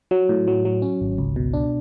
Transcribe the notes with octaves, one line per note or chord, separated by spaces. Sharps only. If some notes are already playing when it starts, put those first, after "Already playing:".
F#3
A2
F#3
F#3
C#4
G#1
C#2
B2
D4